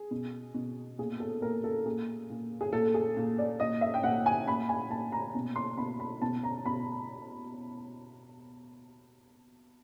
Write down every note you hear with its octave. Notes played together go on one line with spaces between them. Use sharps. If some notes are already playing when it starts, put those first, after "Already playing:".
Already playing: G#4
B2
B2
A#2 G#4
A4
A#2 A#4
A4
A#2 G#4
A#2
G#4
A#2 A4
G#4
A#2
D5
A#2 D#5
E5
G5
A#2 F#5
G#5
A#2 B5
G#5
A#2 A5
A#5
B2
C6
B2 B5
B5
B2 A5
A#5
B2 B5